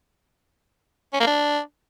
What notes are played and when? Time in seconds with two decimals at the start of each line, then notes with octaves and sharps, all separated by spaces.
1.14 C#4
1.20 A#3
1.27 D4